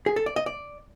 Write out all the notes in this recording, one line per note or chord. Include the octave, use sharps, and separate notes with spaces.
G#4
A4
D5
D#5
D5